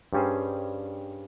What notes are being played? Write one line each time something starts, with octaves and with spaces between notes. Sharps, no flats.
G2 G3 C#4 G#4 C5